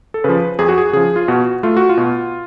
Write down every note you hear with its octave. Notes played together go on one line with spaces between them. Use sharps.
A4
C#3 F3 B4
F2 G#4
F#4
G#4
C#3 F3 G#4
F4
B2 F#4
A3 F4
F#4
F4
B2